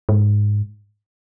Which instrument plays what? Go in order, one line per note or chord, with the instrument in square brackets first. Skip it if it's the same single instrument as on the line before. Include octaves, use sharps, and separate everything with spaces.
[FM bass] G#2